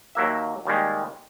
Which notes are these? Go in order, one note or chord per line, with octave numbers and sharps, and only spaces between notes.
D#2 F#3 A#3 E5
D#2 D#3 G3 G#3